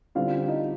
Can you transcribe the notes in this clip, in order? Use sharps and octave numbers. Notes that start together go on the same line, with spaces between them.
D3 G3 C4 F4 F5
D#4 D#5